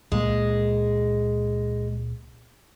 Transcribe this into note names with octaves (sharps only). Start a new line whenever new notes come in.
C#2 A#2 G#3 A#3